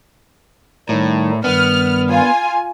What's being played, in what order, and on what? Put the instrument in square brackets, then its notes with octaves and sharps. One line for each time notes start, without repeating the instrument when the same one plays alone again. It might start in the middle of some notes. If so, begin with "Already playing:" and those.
[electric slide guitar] A2 [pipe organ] D#3 G3 D#4
[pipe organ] G2 D#3 G3 [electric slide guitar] B3 [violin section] F6
[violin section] F4 G#5